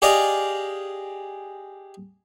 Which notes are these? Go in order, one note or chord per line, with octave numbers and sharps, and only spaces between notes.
G4 G#4 D5 D#5 F5